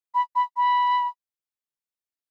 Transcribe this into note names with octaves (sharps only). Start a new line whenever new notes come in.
B5
B5
B5